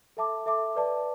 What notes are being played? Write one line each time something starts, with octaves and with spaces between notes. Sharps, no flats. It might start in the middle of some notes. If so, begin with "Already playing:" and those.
A4 E5 A5 D6
A4 E5 A5 D6
B4 D5 A5